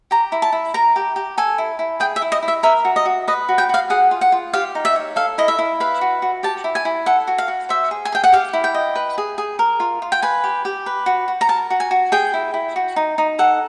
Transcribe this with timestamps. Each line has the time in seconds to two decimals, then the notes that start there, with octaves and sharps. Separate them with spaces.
0.11 G4 A#5
0.32 E4
0.42 A5
0.52 E4
0.74 A#4 A#5
0.96 G4
1.16 G4
1.38 A4 G#5
1.58 E4
1.79 E4
2.00 G#4 G5
2.16 E5
2.22 E4
2.32 D#5
2.43 E4
2.48 E5
2.63 A#4 E5
2.85 F#4
2.96 D#5
3.05 F#4
3.28 B4 D#5
3.49 F#4
3.58 G5
3.69 F#4 F5
3.90 G#4 F#5
4.11 F4
4.21 F#5
4.32 F4
4.53 G4 F5
4.75 D#4
4.85 E5
4.96 C#5
5.16 A4 F5
5.38 E4 D#5
5.48 E5
5.59 E4
5.80 B4 F5
6.01 F#4
6.22 F#4
6.43 G4 A5
6.64 E4
6.75 G#5
6.85 E4
7.06 A4 F#5
7.27 F#4
7.38 F5
7.48 F#4
7.69 C5 E5
7.91 G#4
8.05 G#5
8.12 G#4 G5
8.24 F#5
8.32 G4 F5
8.53 E4
8.64 G5
8.74 D#5
8.95 B4
9.18 G#4
9.38 G#4
9.59 A#4
9.80 F4
10.02 F4
10.12 G5
10.22 B4 G#5
10.44 G4
10.65 G4
10.86 B4
11.06 F#4
11.28 F#4
11.41 A#5
11.49 A#4 A5
11.70 F#4
11.80 G#5
11.91 F#4
12.12 G#4 G5
12.34 E4
12.54 E4
12.76 F#4
12.96 D#4
13.18 D#4
13.39 A4 F#5